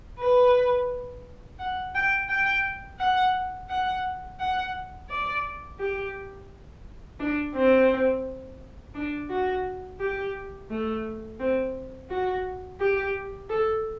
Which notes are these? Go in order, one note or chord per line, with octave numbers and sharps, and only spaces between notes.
B4
F#5
G5
G5
F#5
F#5
F#5
D5
G4
D4
C4
D4
F#4
G4
A3
C4
F#4
G4
A4